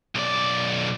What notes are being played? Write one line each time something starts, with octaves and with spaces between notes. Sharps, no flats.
B1 D5